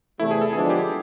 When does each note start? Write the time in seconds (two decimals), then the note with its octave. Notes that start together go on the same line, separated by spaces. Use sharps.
0.20 E2 C3 E3 A3 E4
0.31 G#4
0.42 A4
0.53 D3 F3 G#3 B3 D4 G#4
0.70 G4